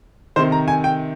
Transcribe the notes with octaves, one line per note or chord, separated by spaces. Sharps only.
C3 D#3 C5
A#5
G#5
G5